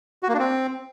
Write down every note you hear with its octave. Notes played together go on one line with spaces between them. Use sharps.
F#4
A#3
D4
C4